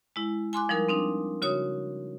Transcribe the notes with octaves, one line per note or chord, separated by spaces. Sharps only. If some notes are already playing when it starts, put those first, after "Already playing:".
G#3 E4
G#5 C6 D6 F#6
F3 G3 D#4 A#4
C4 D4 D#4
C#3 F#4 C#5 D#6